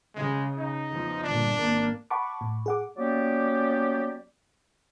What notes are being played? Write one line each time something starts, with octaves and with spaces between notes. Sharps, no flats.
C#3 G#3
D#4
E2 F3
G1 A#2 D4
G#1 A#3
F#5 A5 B5 C#6 D6
A2
G#4 F#5 D6
F#3 A#3 B3 C#4 G4 D5